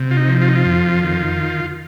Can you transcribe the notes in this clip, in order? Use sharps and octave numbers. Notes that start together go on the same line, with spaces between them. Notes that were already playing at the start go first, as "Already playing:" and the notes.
Already playing: C3
F4
D#4
F3
F4
D#4
F4
F2
D#3